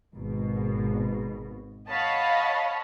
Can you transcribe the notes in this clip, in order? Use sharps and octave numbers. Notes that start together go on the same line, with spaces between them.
G#1 B2
C#5 D#5 F5 F#5 A5 B5